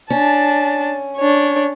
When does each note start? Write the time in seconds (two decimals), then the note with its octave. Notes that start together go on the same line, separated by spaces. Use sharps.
0.10 C#4 D4 A5
1.17 D4 C#5